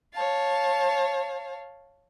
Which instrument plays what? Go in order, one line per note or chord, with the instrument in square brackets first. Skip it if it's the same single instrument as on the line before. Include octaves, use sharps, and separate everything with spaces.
[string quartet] C#5 F5 A5